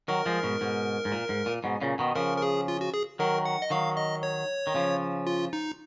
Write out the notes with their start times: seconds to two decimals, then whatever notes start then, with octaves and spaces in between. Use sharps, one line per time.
0.08 D#3 F#3 A#4
0.26 F3 G#3
0.43 G#2 B2
0.61 G#2 B2
1.05 G#2
1.12 A#2
1.29 G#2
1.46 A#2
1.64 G#2 B2
1.81 A#2 C#3
1.99 B2 D#3
2.15 C#3 F3 A#4
2.37 A#4
2.42 G#4
2.68 F4
2.81 F#4
2.94 G#4
3.19 D#3 F#3 A#4
3.45 F#5
3.62 D#5
3.70 D#3 F#3 F5
3.97 D#5
4.23 C#5
4.67 D#3
4.75 C#3 F3
5.27 F4
5.53 D#4